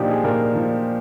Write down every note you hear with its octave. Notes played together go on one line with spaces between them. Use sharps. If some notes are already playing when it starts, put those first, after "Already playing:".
Already playing: A#2 F3 D4 D#4 G4
G#4
A#2 A#4
F3